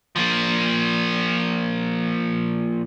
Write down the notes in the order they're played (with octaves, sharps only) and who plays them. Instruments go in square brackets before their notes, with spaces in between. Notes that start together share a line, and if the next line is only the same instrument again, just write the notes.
[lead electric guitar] F3 A#3